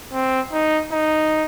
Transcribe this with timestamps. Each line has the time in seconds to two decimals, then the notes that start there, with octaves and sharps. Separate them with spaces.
0.13 C4
0.52 D#4
0.92 D#4